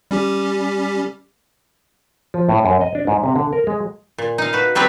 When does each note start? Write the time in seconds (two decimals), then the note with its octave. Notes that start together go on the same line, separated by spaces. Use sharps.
0.11 G3 C#4 G4
2.34 F3
2.49 A2
2.65 F#2
2.81 D#5
2.95 D4
3.07 G#2
3.23 C3
3.36 D3
3.53 A#4
3.67 G#3
4.18 A#2
4.38 D#4 F5
4.53 F#4 B4
4.75 F#3 G3 C4 B4 C#5